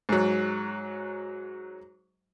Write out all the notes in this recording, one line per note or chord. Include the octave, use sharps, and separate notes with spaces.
G#2 F#3